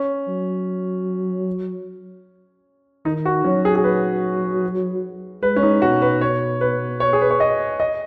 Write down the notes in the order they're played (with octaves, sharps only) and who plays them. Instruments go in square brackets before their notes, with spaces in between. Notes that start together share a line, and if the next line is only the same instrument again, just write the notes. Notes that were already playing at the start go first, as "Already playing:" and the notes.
Already playing: [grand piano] C#4
[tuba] F#3
[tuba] D#3 [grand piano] D#4
[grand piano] F#4
[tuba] F#3 [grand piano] C#4
[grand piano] G#4
G#4
B4
[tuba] G#3 [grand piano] B4
[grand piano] C#4
D#4
[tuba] B2 [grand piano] F#4
[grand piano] B4
C#5
B4
C#5
G#4
B4
C#5
D#5
D#5